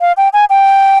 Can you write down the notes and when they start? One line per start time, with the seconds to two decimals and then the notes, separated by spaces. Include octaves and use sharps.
0.01 F5
0.17 G5
0.33 G#5
0.50 G5